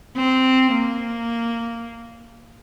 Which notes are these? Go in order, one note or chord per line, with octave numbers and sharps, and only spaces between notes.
C4
A#3